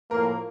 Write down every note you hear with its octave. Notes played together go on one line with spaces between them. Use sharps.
A2 F3 A#3 A#4